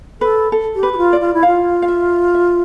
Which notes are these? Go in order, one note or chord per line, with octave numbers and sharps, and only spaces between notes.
A4 B4
A4
G4
B4
G4
F4
D5
F4
E4
F4 F5
F5
E5
E5